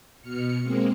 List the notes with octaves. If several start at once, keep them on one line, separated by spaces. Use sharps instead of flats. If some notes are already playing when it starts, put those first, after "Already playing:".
B2 F6 C#7
G#3 A#3 C4